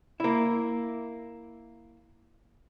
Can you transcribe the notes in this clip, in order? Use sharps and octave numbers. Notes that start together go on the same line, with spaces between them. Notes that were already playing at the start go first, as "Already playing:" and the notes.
A#3 E4